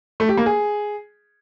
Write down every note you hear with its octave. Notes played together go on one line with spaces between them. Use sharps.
A3
G4
A#3
G#4